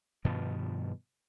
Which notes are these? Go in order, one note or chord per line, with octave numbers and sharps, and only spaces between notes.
G2 B2 D#3 F3